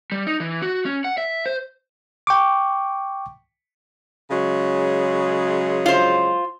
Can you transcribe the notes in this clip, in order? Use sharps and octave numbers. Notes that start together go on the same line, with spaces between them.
G3
D#4
E3
F#4
C#4
F#5
E5
C5
G5 C#6 D6
C#3 F#3 G#3
F4 C5